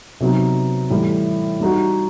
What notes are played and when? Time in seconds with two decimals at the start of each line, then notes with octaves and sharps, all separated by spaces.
0.20 C3 F#3 B3 D#4
0.90 A2 E3 G3
1.60 G3 D#4 F#4